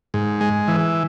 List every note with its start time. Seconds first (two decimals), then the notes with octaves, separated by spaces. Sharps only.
0.14 G#2
0.41 G#3
0.68 E3